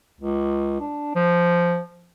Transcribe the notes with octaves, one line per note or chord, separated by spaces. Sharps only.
C#2
D4
F3